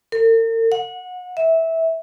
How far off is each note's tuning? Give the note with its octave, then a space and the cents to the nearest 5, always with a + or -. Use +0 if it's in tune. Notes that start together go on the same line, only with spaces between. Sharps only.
A#4 -45
F#5 -25
E5 -15